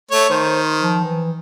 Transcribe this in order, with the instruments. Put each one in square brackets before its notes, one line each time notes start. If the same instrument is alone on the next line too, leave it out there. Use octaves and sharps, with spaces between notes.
[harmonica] A3 C#5
[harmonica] D#3 [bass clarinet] C5
[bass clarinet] F3
E3